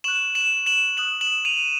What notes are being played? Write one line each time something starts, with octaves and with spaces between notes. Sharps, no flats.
C#6 F#6 E7 F#7
E7 F#7
E7 F#7
D#6 F#6 E7 F#7
E7 F#7
D#7 F7